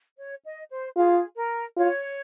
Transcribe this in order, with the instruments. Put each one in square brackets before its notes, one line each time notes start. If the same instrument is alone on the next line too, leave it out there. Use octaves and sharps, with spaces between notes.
[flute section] C#5
D#5
C5
[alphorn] F4 [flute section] G#4
[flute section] A#4
[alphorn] F4 [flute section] C#5